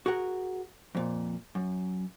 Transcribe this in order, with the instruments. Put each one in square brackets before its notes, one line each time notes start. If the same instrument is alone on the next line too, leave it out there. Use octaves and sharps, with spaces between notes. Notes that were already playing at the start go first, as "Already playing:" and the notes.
[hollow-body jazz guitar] F#4 G#4 A#4 F#5
F2 A#2
F#2